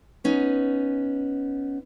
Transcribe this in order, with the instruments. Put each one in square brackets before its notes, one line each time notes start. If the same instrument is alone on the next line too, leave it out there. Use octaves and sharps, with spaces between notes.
[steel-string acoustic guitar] B3 C#4 D#4